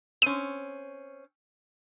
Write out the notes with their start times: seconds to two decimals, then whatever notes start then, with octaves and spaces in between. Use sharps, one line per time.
0.22 C4 C#4 D#7